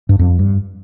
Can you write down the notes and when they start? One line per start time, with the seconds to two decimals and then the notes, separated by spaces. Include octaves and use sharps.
0.09 G2
0.19 F2
0.39 G2